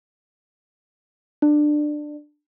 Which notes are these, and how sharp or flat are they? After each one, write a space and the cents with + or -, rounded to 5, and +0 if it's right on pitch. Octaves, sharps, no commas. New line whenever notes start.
D4 +20